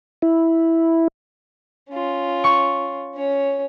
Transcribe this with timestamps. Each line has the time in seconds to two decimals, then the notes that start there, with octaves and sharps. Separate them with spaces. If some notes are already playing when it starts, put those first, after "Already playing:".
0.22 E4
1.89 C#4 F4
2.44 C#6
3.15 C#4 C#5